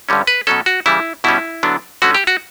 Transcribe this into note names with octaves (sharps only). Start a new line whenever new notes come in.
G2 D3 G3 C#4
B4
B2 F#3 C#4 A4
F#4
C#3 E3 G3 E4
B2 G3 C#4 E4
D3 F#3 B3 D4
D3 A3 C#4 F#4
G4
F#4